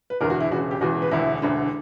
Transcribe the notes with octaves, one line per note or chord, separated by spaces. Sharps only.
B4
E1 E2 D3 A#4
F#4
E4
E1 E2 C#3 F#4
G4
E1 E2 C#3 F#4
B4
E1 D2 D3 E4
E1 D2 D3